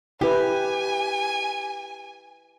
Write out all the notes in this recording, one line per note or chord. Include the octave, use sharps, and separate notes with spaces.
E4 G4 B4 G#5